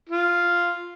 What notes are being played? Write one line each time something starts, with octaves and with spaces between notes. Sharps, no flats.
F4